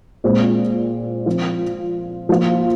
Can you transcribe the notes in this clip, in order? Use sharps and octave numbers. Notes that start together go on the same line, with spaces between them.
A#2 G#3 C4
F3 C4 F4
F3 A#3 F4